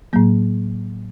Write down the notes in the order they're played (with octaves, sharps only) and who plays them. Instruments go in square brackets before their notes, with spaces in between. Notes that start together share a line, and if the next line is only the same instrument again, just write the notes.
[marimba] A2 F#3 A#3